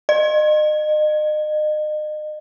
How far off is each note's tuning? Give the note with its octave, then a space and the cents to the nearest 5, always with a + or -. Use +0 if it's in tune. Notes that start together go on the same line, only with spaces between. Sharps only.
D#5 -35